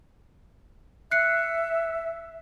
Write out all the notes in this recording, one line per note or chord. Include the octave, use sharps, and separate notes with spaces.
E5 F#6 C7 C#7